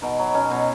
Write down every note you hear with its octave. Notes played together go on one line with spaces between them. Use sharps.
B2 D#4
F#3
B2 C#4
B2